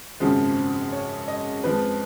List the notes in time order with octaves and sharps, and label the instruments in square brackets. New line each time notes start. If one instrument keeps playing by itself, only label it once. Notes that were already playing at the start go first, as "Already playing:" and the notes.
[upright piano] G#1 F#2 C#3 F3 G#3
C#5
D#5
F2 F3 G#3 B4